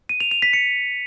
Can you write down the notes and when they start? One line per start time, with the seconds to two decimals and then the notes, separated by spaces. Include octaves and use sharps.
0.09 D#7
0.20 F7
0.31 F7
0.42 B6
0.53 C#7